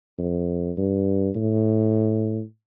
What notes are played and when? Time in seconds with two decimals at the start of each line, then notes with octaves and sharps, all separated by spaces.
0.18 F2
0.77 G2
1.36 A2